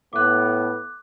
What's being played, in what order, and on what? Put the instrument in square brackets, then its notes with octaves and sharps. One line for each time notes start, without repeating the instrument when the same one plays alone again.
[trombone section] A2 A3 B3 [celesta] D6 F#6